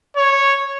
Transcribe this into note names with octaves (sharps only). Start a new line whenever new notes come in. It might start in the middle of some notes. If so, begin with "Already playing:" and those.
C#5